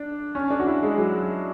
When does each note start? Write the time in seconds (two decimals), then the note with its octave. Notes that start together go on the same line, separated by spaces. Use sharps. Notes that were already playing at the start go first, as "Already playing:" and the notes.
Already playing: D4
0.35 C#4
0.50 D4
0.60 F#4
0.67 E4
0.83 G#3
0.98 F#3